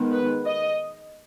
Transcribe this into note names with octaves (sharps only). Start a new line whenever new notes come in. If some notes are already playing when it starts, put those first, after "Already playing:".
Already playing: D#3 G#3 B3
B4
D#5